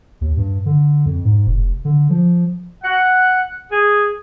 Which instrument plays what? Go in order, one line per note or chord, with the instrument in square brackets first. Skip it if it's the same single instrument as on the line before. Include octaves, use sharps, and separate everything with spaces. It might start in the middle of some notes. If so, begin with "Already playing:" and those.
[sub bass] D#2
G2
D3
F2
G#2
F1
D3
F3
[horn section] F#5
G#4